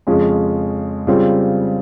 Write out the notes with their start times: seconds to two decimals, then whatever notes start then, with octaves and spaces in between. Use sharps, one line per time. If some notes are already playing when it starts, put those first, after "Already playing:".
0.07 F2 C#3 G#3 C#4 F4
1.07 C#3 G3 C4 F4